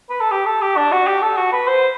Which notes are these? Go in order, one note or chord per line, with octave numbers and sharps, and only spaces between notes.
B4
A4
G4
A4
G4
D4
F#4
G4
A4
F#4
B4
C5